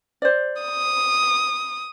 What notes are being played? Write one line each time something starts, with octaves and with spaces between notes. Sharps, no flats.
C5 D5
D#6